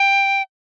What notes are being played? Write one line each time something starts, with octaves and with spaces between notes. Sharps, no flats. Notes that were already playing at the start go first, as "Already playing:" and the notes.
Already playing: G5